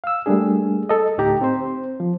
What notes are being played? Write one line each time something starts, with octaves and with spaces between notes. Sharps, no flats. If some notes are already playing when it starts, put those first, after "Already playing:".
F5 E6
G3 A3 A#3 D4 G#4
A4 D#5
D2 A2 D#4 G4 A#5
C4 C5
F3